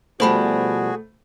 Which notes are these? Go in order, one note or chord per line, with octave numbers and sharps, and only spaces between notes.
B2 F3 G3 A3 F#4 G#4 C5 B5